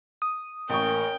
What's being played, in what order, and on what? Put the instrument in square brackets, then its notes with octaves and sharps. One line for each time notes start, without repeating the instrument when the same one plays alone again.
[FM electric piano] D#6
[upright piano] A1 A#3 C#6 [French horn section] C#4 A#4 [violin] G5